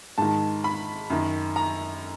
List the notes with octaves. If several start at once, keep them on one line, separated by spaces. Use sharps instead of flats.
G#2 D#3 A5
B5
F#2 D#3
A#5